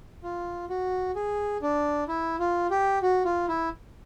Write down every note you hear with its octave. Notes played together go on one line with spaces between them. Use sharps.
F4
F#4
G#4
D4
E4
F4
G4
F#4
F4
E4